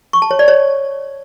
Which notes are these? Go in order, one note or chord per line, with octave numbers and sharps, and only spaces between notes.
C#6
A5
C#5
D5
C#5